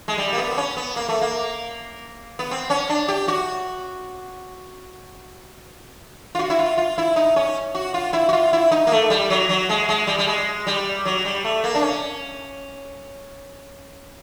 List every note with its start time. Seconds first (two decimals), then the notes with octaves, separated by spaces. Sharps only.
0.08 G#3
0.18 G3
0.33 A#3
0.38 B3
0.52 C4
0.57 C#4
0.77 B3
0.96 A#3
1.09 A3
1.21 A#3
2.39 B3
2.51 C4
2.70 C#4
2.89 D4
3.08 G4
3.28 F#4
6.35 F4
6.39 F#4
6.50 E4
6.59 F4
6.78 F4
6.98 E4
7.16 D#4
7.36 C#4
7.75 F#4
7.94 F4
8.13 E4
8.29 F#4
8.33 F4
8.53 E4
8.71 D#4
8.87 A#3
8.92 A3
9.10 G3
9.30 F#3
9.49 F#3
9.69 G#3
9.89 G#3
10.07 G3
10.18 G3
10.27 G#3
10.67 G3
11.05 F#3
11.25 G3
11.44 A3
11.64 A#3
11.75 D4
11.82 C#4